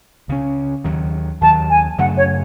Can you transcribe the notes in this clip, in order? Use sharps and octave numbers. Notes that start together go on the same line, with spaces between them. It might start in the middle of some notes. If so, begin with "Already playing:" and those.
C#2 C#3 G#3 C#4
D#2 D#3 F#3
D#2 D#3 F#3 A5
G#5
F#2 C#3 F#3 A3 F#5
C#5